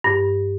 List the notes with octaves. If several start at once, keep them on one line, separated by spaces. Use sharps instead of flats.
G2